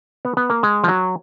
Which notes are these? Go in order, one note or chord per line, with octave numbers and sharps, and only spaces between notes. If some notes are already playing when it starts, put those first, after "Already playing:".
B3
B3
A#3
G#3
F3
F#3